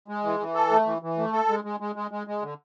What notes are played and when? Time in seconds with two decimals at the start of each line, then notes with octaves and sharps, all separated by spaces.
0.08 G#3
0.24 E3
0.40 E3
0.55 A4
0.71 A3
0.86 E3
1.02 E3
1.18 A3
1.33 A4
1.49 G#3
1.64 G#3
1.80 G#3
1.95 G#3
2.11 G#3
2.27 G#3
2.42 D3